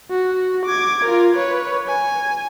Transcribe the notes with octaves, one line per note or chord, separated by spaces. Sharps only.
F#4
D6 G#6
F4 A#4
B4 C#5
G#5